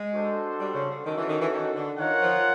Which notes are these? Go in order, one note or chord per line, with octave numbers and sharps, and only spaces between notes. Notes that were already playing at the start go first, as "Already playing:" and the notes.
Already playing: G#3
D4 F#4 A4 C5
G3
C#3
D3
D#3 C#4 F#4 A4
E3
D#3
E3
D#3
D3
D#3 F4 A#4 C#5 F#5
F3